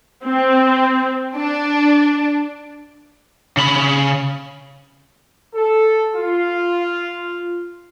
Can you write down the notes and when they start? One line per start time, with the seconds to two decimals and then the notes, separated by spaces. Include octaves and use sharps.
0.25 C4
1.37 D4
3.57 C#3 B5
5.55 A4
6.15 F4